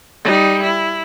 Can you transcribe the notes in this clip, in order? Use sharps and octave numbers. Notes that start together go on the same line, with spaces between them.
G3 D#4
E4